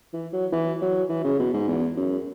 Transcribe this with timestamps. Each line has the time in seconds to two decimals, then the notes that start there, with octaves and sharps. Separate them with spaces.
0.13 E3
0.33 F#3
0.52 E3
0.82 F#3
1.10 E3
1.24 C#3
1.39 B2
1.54 G#2
1.68 E2
1.97 F#2